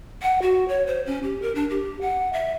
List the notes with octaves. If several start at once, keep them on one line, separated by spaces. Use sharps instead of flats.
F#5
F#4
C#5
C5
C#4
G4
A#4
D4
G4
F#5
E5